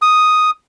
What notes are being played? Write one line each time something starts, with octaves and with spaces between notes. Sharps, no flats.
D#6